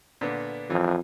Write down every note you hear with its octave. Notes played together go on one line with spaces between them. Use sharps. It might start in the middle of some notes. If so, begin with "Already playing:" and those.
A#2 D3 B3
F2 E3